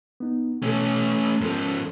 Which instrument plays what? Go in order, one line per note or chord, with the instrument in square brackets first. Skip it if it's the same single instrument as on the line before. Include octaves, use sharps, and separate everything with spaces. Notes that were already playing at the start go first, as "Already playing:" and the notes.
[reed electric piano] B3 D#4
[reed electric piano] B2 A4 [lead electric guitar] A3 C#4
[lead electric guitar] G#2 F3 [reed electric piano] C#4 A4 A#4